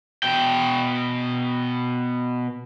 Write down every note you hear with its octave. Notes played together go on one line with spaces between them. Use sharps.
B2 G5